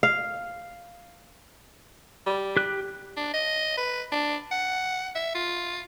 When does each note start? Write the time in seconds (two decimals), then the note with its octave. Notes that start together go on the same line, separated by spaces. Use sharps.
0.03 F5
2.26 G3
2.57 G4 F#6
3.17 D4
3.34 D#5
3.77 B4
4.12 D4
4.51 F#5
5.16 E5
5.35 F4